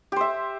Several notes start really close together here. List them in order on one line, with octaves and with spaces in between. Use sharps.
G4 C5 E5